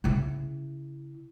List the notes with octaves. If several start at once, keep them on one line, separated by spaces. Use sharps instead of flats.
C#3 E4